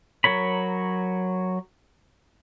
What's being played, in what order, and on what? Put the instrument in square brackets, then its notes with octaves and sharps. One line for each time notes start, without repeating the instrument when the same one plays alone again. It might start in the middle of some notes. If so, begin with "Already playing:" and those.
[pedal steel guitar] F#3 A#4 C#5 B5